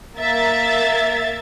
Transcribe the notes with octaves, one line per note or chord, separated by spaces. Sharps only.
A#3 E5 A6